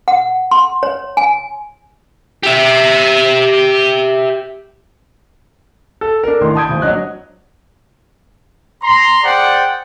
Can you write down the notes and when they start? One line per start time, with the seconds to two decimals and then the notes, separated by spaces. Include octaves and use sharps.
0.08 F#5
0.51 C6
0.83 C#5
1.17 G#5
2.43 G4 E5
6.01 A4
6.23 D4 A4 A#4
6.41 A1 D#3 E3 C6
6.55 A5 B5 D#6 G6 G#6 D7
6.69 D1 G#1
6.82 F#3 D4 D#5 F#6
8.82 A#5 C6
9.23 G#4 C5 D5 F#5 G5